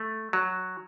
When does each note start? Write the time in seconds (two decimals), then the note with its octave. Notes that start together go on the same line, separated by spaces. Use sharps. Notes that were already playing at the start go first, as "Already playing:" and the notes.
Already playing: A3
0.33 F#3